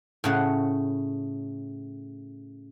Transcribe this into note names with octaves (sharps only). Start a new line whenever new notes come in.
A2 C#3 F#5